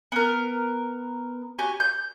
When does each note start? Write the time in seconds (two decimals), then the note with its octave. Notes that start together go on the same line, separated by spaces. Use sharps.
0.12 B3 A#4
1.59 F#4 G4 G#5
1.80 G6